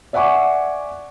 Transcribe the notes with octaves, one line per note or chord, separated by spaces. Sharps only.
D5 E5 F#5 G#5 C#6 D6